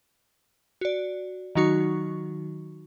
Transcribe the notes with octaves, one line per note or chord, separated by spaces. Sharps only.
F#4 D5
D#3 F#3 D#4 F#4 C#6